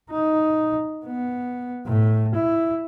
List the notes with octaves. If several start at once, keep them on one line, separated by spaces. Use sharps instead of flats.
D#4
B3
A2
E4